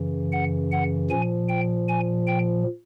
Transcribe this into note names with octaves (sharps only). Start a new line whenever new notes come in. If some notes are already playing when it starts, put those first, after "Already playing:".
Already playing: F#2 C#3 E3
F#5
F#5
A#2 F3 G#5
G5
G#5
G5